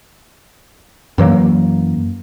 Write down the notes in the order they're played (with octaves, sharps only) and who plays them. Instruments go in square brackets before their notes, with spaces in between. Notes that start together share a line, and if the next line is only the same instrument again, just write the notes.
[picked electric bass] F#2 E3 F#3 A#3